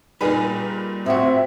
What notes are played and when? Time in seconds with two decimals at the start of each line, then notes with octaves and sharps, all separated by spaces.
0.21 A#2 G3 D#4 G#4 A#4 B4
1.06 A2 C4 F#4 E5